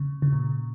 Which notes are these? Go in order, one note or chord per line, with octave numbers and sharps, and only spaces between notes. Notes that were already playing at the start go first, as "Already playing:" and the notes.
Already playing: C#3
C#3
A#2